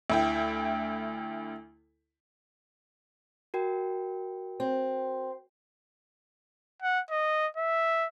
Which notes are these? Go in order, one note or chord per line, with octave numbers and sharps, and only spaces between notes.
D2 E4 G5
F#4 A#4 G5
C4
F#5
D#5
E5